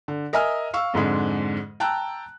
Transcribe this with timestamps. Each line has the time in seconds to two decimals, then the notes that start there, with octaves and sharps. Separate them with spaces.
0.08 D3
0.33 A#4 D#5 E5 G#5 D#6 F6
0.74 F5 C#6 E6
0.94 F2 G#2 D3 G#3
1.80 G5 A5 A#5 E6 F#6